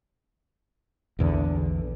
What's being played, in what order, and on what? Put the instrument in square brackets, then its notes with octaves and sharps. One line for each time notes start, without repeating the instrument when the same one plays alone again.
[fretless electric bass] A#1 E2 D3